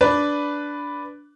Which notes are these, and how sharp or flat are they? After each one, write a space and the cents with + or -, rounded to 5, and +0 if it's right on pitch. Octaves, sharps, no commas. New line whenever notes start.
D4 -10 B4 +0